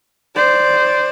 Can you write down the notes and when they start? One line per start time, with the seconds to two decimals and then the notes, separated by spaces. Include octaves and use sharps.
0.36 C5 D5